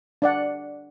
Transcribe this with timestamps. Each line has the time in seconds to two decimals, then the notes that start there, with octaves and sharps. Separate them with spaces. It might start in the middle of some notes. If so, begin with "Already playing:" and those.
0.22 D4 D5 F#5